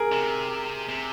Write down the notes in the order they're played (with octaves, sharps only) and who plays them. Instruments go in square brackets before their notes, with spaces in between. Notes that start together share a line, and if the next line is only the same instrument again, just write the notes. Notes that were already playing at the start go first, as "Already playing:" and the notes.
Already playing: [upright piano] G#4 A#4
[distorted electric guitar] C3
C3